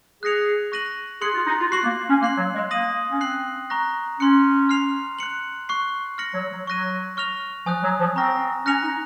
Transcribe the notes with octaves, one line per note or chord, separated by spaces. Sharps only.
G#4 F#6 A#6 C#7 F7
C#6 F#6 A#6 D#7 F#7
G#4 C6 F#6 C#7 F#7
F4
D#4
F4
F#4 F#6 C7 F#7
A#3
C#4
A#3 C6 F#6 C7 F#7
F#3
G#3
A#3 D#6 A#6 D#7 F#7
C#4
C4 F#6 C7 F#7
A#5 C#6 F#6 A#6
C#4 C6 F#6 C#7
F6 C7 F7
F#6 C#7 F#7
C#6 F#6 C7
F6 A#6 C#7 F#7
F#3
F#3
F#3 C#6 F#6 A#6 D#7
C#6 F6 A#6 F7
F3 G#5 D#6 F#6
F#3
F3
C4 A#5 C#6 F6 A#6
C#4 F#6 A#6 C#7 F7
D#4